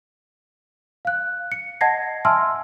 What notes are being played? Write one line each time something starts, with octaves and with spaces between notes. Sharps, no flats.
F5 F#6
C#7
D#5 F#5 A5 G#6 A#6 C7
E5 G#5 A5 C6 E6 F6